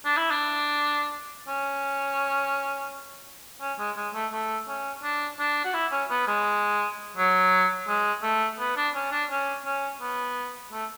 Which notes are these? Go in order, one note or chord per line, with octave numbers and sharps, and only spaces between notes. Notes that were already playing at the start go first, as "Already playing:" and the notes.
D4
E4
D4
C#4
C#4
G#3
G#3
A3
A3
C#4
D4
D4
F#4
E4
C#4
B3
G#3
F#3
G#3
A3
B3
D4
C#4
D4
C#4
C#4
B3
A3